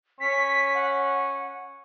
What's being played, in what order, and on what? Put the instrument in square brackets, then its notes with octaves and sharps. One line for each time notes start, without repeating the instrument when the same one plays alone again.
[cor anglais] C#4 [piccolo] B6
[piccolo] F#5